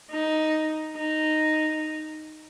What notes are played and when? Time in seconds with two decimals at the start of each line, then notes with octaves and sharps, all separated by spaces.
0.11 D#4
0.97 D#4